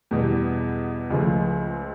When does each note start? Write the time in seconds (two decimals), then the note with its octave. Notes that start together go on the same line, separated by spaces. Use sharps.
0.11 E2 B2 G3
1.10 C#2 C#3 F3 A3